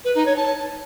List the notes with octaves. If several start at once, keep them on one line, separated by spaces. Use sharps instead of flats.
B4
D#4
C#5
A5